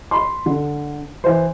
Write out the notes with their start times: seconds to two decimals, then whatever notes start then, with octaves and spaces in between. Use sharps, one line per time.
0.11 B5 C6
0.46 D3
1.24 E3 C5